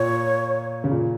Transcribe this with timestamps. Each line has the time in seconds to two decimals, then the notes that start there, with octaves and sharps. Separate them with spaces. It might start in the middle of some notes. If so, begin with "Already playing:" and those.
Already playing: A#2 C#5
0.84 C#3
0.91 A#2